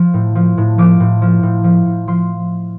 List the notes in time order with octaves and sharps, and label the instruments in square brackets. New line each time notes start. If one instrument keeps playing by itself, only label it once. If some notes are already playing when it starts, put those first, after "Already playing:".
Already playing: [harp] F3
A2
F3
A2
F3 D6
A2
F3
A2
F3
A2
F3 C6